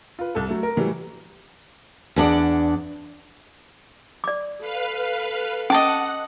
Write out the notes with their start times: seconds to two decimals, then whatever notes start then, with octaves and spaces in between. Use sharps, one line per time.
0.19 F4 B4
0.35 C2 A4
0.48 F#3 A3
0.63 A#4
0.77 A2 E3 F#3 G3 A3
2.16 E2 D4 D5 F#5
4.24 D5 D6
4.60 A4 B4 F5
5.70 C#4 D#5 F#5 A5 D6